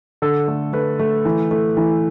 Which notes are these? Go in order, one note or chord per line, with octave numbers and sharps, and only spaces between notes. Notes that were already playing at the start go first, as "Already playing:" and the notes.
D3 A4
A3
A3 B4
A3
E3
A3
E3